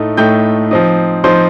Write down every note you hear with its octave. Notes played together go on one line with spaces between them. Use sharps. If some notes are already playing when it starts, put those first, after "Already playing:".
Already playing: A2 A3 D#4
A2 A3 D#4 G5 G6
F3 C4 D#4
F3 C4 D#4 C5 C6